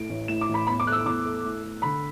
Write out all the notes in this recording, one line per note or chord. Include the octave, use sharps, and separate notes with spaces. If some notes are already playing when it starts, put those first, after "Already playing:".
Already playing: A2 A3 D7
A1
A2 E7
D6
A1
B5
E2 B5
D6
A3 F#6
E6
E2 D6
A3
A2
A3
D3 B5